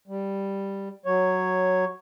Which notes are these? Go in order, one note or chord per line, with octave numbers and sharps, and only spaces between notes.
G3
F#3 C#5